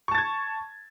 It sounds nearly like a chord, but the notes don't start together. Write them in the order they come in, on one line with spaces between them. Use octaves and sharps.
C#6 A5 A6 G#6